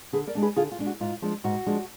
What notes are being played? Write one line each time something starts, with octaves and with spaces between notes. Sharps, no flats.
D3 G#4 B4
A#4 D5
G#3 D4
G#4 B4
D3 F4 G#4
F4
G#3 D4
F#4
G#2 F4
F3 G#3 D4
G#2 F#4
F3 G#3 D4